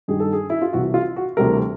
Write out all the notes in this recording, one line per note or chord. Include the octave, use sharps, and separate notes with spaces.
G2 D#3 G3 G#4
A4
G#4
E4
F4
C2 C3 E3 F#4
F4
F#4
D2 C3 E3 G3 A#4